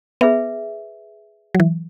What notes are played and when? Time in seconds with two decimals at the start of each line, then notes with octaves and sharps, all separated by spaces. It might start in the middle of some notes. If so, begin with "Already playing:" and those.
0.21 B3 G#4 B4 E5
1.55 F#3
1.60 E3